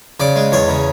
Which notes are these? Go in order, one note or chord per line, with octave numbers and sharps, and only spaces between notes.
C#3 D5
G#3
E2 C#5
C#3